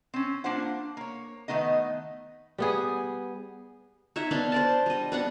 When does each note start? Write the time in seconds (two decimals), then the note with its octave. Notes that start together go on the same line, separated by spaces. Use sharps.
0.14 C4 C#4
0.44 A#3 D4 F4 C5 F#5
0.97 A#3 C#5
1.48 D#3 A3 B3 D#4 D#5
2.58 G3 B3 G#4
4.16 D#4 C#5 E5 F#5
4.31 B3 D4 F5 C6
4.52 C5 D5 A5
4.86 G3 D#5
5.12 B3 D4 F#5